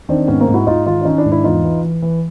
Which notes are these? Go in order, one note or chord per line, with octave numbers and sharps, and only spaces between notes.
D#3 C4 D4
G#2 B3 C#4
A#3 C4
G#2
E4 F#4
G#2 D#4 F4
D#3 D#4 F4
D4
D#3 C#4 D#4
D4 E4
G#2
D4 E4
E2 D#4 F4
E3
E3
E3